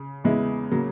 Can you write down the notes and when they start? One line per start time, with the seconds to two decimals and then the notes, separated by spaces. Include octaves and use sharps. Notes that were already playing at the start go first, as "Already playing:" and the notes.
Already playing: C#3
0.24 E2 C#3 G#3 B3 E4
0.71 C#3 F#3 A#3